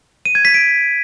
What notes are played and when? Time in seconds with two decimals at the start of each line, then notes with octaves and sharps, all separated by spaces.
0.25 D#7
0.35 G#6
0.45 B6
0.54 D7